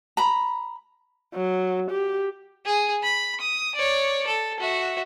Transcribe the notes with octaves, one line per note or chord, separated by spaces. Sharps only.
A#5 B5
F#3
G4
G#4
B5
D#6
C#5 D5
A4
F#4 E5